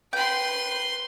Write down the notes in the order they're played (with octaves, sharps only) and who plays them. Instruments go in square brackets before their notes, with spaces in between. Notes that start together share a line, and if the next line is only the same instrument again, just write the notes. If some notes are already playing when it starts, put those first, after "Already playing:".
[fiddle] B4 C6 [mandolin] G5